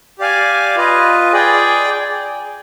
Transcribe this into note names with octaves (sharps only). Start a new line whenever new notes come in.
G4 D5 F5 G#5
F4 B4 D#5
G#4 D5 G5